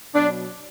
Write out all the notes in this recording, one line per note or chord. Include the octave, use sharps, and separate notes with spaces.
B2 F#3 D4